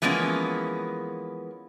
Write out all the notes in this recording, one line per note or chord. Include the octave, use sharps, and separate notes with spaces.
E3 F3 G#3 A#3 B3 C#4